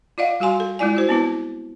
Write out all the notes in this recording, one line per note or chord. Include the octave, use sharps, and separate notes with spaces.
F4 D5 D#5 F5 F#5
G3 F#4 F5 G#5 C6
A4
G#3 E4 F4 D5 G#5
E4 F#4 C5
B3 C4 E4 B4